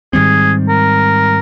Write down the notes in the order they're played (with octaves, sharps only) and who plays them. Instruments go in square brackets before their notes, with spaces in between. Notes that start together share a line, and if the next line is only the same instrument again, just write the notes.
[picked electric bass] G#2 D#3 G3 C4 [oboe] G#4
[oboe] A#4